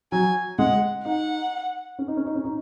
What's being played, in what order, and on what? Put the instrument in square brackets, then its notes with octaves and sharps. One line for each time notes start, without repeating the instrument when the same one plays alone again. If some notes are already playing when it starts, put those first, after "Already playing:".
[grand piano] F#3 [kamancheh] G#5
[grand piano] G#3 [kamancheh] F#5
[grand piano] D#4 [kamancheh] F#5
[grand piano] C#4
D#4
C#4
D#4
C#4
D#4